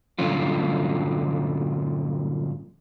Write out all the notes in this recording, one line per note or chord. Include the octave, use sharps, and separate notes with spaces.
G2 A#2 D3 F#3 C#4 F4